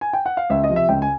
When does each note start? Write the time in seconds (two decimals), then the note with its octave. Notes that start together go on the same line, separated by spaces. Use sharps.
0.01 G#5
0.13 G5
0.26 F#5
0.37 F5
0.50 C#2 E5
0.64 D#5
0.69 C3 F3
0.76 E5
0.89 C#2 G5
1.02 G#5